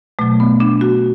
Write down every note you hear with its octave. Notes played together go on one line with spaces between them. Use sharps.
B2 F#3 A3
B3
D4
F#4